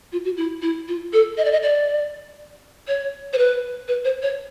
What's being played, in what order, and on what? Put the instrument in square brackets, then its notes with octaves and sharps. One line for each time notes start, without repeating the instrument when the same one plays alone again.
[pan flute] F4
F#4
E4
E4
F4
A4
D#5
D5
D#5
D5
C#5
C5
B4
B4
C5
C#5